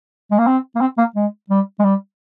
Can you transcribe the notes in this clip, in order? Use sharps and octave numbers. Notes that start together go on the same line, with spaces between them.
G#3
A#3
C4
A#3
C4
A#3
G#3
G3
G#3
G3